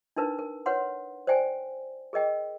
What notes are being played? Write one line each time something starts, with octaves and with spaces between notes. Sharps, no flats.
D4 D#4 A#4 B4
A#4
B4 C#5 F#5 C6
C5 D5 G5 G#5
G#4 A#4 D#5 G5